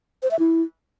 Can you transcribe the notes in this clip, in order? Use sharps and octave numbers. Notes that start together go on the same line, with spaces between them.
C5
E5
E4